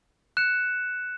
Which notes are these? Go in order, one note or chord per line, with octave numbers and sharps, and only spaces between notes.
F#6 C#7 E7